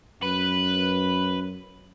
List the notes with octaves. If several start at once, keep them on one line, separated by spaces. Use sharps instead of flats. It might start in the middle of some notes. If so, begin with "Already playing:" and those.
F#2 B4